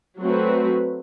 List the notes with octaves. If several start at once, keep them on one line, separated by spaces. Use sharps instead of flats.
F#3 A3 C4 F#4 B4